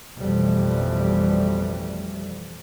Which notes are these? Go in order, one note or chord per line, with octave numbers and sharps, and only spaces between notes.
A1 F2 B2 E3 G3